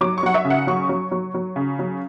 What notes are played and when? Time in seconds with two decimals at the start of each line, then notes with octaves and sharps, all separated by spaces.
0.01 F#3 D6
0.18 C#6
0.23 F#3 F#5
0.34 E5
0.45 C#3
0.50 F#5
0.67 F#3 C#6
0.89 F#3
1.11 F#3
1.34 F#3
1.56 C#3
1.79 F#3